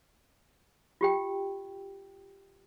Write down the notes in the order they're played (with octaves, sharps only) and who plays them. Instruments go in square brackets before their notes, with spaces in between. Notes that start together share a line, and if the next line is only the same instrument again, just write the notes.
[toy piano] F4 G4 G5